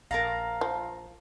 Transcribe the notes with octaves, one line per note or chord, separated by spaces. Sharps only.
A#1 A#4 F5 A5 A#5
F3